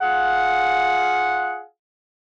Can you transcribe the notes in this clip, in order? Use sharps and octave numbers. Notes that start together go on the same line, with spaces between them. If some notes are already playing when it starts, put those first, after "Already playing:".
F4 G#4 F5 F#5